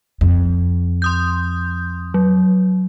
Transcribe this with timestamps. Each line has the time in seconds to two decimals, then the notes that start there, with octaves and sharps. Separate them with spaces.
0.21 F2
1.02 C6 D#6 G6
2.14 F#3